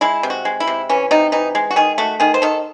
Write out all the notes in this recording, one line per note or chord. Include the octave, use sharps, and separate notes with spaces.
G#3 E4
C3
F#4
G#3
E4
C3
E3 C#4
C3 D#4
E3 D#4
G#3
F#4
D#3 G#4
A3 F#4
D#3 G#4
C5
D#3 A4